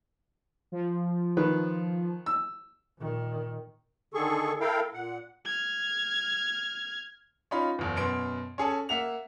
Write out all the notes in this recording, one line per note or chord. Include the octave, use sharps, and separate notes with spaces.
F3
D#3 B4
E6
A#2 D#3
D3 D#3 G#4 A4 C#6
E4 A4 A#4 F5 G5
A#2 F#5
F6 G#6
C#4 D#4 F4 B5
F#1 E2
F#2 B2 C6 D7
C#4 G#4 A4
A#3 E5 F#5 F7